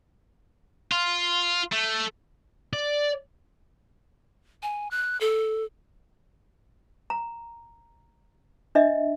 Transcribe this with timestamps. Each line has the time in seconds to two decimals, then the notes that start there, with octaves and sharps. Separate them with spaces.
0.92 F4
1.72 A3
2.73 D5
4.63 G#5
4.91 F#6
5.21 A4
7.10 A#5
8.75 D4 D#5 E5